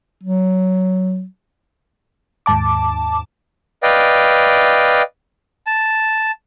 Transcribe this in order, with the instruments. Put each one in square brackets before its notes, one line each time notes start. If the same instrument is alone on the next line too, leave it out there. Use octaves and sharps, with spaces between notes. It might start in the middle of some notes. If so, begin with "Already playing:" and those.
[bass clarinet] F#3
[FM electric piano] D#2 G#2 A5 D6
[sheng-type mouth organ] B4 D5 D#5 F5 G5
A5